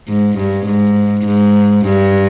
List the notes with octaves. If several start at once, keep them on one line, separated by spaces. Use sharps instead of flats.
G#2
G2
G#2
G#2
G2